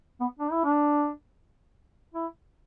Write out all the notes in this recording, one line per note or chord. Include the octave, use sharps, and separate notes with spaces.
B3
D4
E4
D4
E4